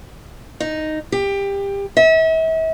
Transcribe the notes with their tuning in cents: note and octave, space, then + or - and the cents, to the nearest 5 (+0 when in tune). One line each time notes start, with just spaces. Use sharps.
D#4 -5
G4 +20
E5 -40